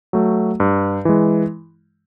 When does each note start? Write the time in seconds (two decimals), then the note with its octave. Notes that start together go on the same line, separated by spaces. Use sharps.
0.13 F#3 A3
0.60 G2
1.05 E3 G#3